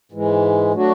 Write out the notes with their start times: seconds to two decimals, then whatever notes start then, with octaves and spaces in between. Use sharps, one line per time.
0.12 G#2 E3 G#3
0.73 F#3 A3 D4 F#4